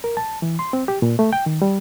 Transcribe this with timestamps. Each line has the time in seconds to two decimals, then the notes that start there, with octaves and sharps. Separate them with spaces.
0.04 A#4
0.17 A5
0.42 E3
0.59 C6
0.73 C4
0.88 G4
1.02 A#2
1.19 A3
1.33 G5
1.46 D#3
1.62 G3